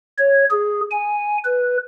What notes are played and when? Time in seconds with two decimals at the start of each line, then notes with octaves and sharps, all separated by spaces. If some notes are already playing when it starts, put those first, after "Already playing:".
0.19 C#5
0.51 G#4
0.91 G#5
1.45 B4